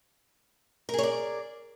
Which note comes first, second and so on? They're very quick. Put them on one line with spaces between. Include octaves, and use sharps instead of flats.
A#4 G#4 C#5 D5